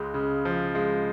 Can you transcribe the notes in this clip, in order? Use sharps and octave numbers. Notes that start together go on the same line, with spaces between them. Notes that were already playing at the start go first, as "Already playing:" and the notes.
Already playing: C#2 G#3
C#3
F3
G#3